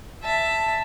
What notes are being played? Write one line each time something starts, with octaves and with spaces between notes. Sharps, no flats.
E5 A5